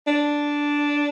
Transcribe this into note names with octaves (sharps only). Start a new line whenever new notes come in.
D4